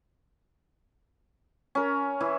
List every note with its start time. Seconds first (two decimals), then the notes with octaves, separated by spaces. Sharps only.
1.75 C#4 A#4
2.20 E3 E4